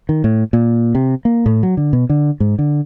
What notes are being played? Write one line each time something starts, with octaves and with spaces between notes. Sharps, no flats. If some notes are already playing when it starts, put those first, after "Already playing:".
D#3
A2
A#2
C3
A#3
A2
F#3
D3
B2
D3
G#2
D3